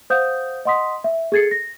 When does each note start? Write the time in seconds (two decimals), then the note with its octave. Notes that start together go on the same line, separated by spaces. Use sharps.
0.10 C5 F5 F#5 D#6 G6
0.65 D#5 F#5 C6 D#6 B6
1.04 E5
1.32 G#4 A4 G#6 A6 C7 C#7
1.51 A#6